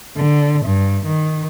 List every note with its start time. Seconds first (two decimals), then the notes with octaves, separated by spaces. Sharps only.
0.17 D3
0.66 G2
1.06 D#3